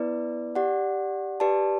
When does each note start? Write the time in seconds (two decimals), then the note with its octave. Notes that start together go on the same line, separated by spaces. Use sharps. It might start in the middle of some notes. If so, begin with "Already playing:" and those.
Already playing: B3 E4 B4 D5
0.55 G4 D5 F#5
1.40 G4 B4 D5 A5